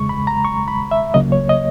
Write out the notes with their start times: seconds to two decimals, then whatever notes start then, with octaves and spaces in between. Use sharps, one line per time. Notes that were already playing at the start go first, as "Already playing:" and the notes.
Already playing: E2 C#3 G#3 C#6
0.09 B5
0.27 A#5
0.45 C#6
0.68 B5
0.91 E5
1.14 C#2 C#3 F#3 A#3 D#5
1.32 C#5
1.49 D#5